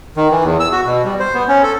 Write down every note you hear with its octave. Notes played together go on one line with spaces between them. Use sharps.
D#3
E3
E2
E6
F#4
B2
G3
C5
B3
C#4
A4